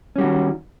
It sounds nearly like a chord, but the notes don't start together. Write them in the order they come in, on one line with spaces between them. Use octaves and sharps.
C#4 G3 F#4 D#3